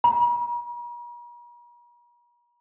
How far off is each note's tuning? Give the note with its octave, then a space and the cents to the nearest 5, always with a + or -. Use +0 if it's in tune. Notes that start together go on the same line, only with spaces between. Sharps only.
A#5 +45